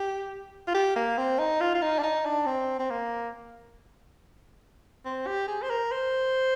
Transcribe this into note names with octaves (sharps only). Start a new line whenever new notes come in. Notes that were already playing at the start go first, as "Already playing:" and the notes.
Already playing: G4
F4
G4
A#3
C4
D#4
F4
F4
D#4
D4
D#4
D4
C4
C4
A#3
C4
G4
G#4
C5
A#4
C5